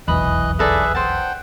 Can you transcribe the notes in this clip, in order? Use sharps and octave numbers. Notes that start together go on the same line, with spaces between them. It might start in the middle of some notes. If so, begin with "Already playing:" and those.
F1 B1 E2 E3 D#5 B5 D#6 F#6
D#4 G#4 A4 B4 D5 E5
C5 F#5 G5 A5